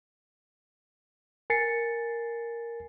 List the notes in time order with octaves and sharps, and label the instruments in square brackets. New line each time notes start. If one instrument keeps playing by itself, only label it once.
[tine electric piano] A#4 G#5 A6 C7 C#7